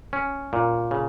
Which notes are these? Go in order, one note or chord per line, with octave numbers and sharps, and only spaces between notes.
C#4
A#2
C#3